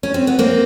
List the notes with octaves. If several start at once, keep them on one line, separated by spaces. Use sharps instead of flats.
C#4
C4
B3
A#3 C4